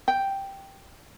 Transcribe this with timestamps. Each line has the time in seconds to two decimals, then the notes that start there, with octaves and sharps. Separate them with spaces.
0.08 G5